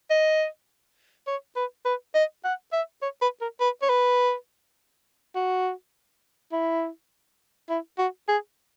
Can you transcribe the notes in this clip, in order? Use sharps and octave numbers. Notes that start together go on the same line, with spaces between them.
D#5
C#5
B4
B4
D#5
F#5
E5
C#5
B4
A#4
B4
C#5
B4
F#4
E4
E4
F#4
G#4